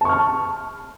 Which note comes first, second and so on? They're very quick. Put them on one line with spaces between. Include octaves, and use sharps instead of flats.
A5 C#6 F6